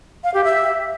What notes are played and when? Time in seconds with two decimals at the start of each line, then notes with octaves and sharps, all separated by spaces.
0.24 F5
0.34 G4
0.44 E5